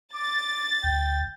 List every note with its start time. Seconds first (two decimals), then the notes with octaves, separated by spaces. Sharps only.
0.14 D6 A6
0.84 D2 G5